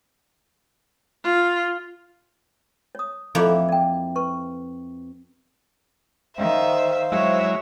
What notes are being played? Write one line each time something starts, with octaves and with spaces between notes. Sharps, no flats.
F4
C#5 D#6
F2 A#3 E4 D#5 F5 D6
D5 G5
B4 C#6
D#3 C5 E5 F5
F#3 G#3 E4 C#5 E5